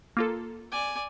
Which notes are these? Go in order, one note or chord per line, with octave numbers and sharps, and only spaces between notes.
A#3 F4 A4
D5 G#5